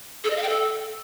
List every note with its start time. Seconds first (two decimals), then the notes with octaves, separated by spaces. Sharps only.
0.24 A4
0.30 D#5
0.36 F5
0.43 G5
0.49 A4